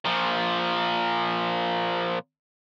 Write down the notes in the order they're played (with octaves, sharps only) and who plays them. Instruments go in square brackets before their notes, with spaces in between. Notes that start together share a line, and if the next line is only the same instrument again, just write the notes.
[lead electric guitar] A#2 F3